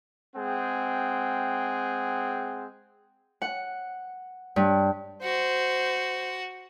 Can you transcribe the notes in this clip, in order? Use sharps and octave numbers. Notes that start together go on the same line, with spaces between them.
G#3 C4 G#4 F#5 G5
F#5
G2
F#4 C5